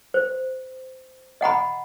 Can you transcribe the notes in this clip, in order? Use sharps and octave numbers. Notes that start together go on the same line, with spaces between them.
C5
D#5 F#5 A#5 B5